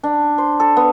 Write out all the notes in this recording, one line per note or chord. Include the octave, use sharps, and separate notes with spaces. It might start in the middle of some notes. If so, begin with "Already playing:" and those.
D4
C5
A4
B3